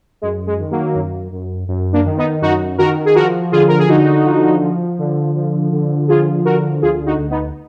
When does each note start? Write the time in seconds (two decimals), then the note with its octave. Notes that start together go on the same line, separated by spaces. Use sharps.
0.22 F#2 G#3
0.47 G#3
0.59 D#3
0.71 F#3 A#3
0.95 F#2
1.32 F#2
1.68 F#2
1.93 A#3 D4
2.05 D#3
2.17 B3 D#4
2.42 F#2 D#4 F#4
2.78 D#3 F#4 A#4
3.05 G#4
3.15 F3 F#4 A#4
3.52 D3 F4 G#4
3.68 A#4
3.79 G#4
3.88 D3 D#4 F#4
4.25 F3
4.62 F3
4.99 D3
5.35 F3
5.72 D3
6.08 F3 F4 G#4
6.45 D3 F#4 A#4
6.82 D2 F4 G#4
7.06 D#4 F#4
7.18 D2
7.30 B3 D#4